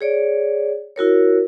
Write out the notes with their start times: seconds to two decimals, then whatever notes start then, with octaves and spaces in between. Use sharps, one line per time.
0.01 G#4 C#5 D5
0.96 E4 F#4 A#4 C#5